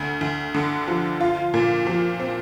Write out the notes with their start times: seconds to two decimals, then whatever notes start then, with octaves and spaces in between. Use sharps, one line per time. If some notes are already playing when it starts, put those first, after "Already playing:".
Already playing: D2
0.21 D2
0.54 D3
0.88 F3
1.20 F4
1.54 A#2
1.87 F3
2.20 C4